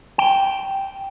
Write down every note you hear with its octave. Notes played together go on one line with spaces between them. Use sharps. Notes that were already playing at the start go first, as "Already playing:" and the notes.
G5